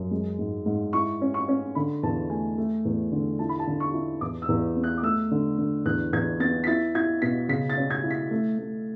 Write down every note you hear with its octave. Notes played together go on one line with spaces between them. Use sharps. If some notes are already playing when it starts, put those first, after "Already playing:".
Already playing: F#2
G#3
G#2
G#2
E4 C#6
C#4
C#6
C#4
D3 B5
E2 A5
A3 G#5
A3
E2
D3
E4 A5
B5
A5
D3
C#6
E4
E2 D6
E6
E2
B3
F#6
D6
A3 E6
D3
D3
E2 F#6
E2 G#6
B3 A6
B6
E4 A6
E4 G#6
B2 B6
C#3 B6
A6
C#4
G#6
E4
B6
A3
A3